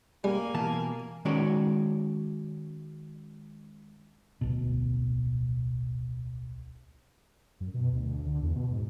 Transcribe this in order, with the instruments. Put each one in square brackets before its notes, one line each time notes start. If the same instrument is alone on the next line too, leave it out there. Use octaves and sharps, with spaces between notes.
[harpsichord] G3 [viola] A#3 [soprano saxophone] G#5
[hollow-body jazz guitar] B2 E3 A5
D#3 G#3 C#4 F#4 C#5 D5
[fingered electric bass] D1 B1 B2
[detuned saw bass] F#2
B2
D2
D2
D3
E2
B2
G#2